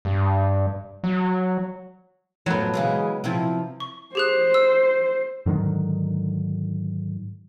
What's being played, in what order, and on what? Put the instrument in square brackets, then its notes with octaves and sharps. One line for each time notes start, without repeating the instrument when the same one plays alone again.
[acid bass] G2
F#3
[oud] F2 A2 C5 [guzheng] F#3 B3
[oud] C#3 E3 G#3
C3 F3 E4
[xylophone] C#6
[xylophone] G4 G#4 F#6 [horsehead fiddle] C5
[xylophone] E6
[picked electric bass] G#2 D3 D#3 F#3